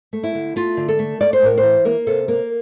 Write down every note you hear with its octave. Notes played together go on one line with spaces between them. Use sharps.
A3
E4
D3
A3 F4
D3
A4
A3
A3 D5
C5
A2 A#4
C5
E3
A#3 A#4
C3 A4
A#3 A#4